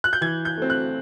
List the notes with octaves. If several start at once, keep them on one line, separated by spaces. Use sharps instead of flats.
F#6
G6
E3 G#6
G6
A3 C4
F#6